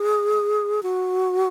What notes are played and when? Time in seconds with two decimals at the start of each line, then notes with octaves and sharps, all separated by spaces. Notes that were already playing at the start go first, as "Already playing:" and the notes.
Already playing: G#4
0.83 F#4